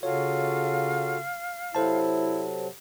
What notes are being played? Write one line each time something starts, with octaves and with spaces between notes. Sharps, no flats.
C#3 F4 F#4 A4 C#5 F5
C3 F#3 E4 A4 C5 A5